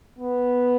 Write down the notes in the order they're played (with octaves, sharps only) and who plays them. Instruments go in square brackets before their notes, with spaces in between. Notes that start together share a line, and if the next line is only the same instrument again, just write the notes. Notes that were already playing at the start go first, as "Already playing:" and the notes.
[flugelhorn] B3